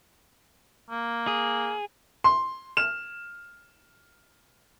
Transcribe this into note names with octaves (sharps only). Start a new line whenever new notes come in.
A#3
G#4
C6
F6 E7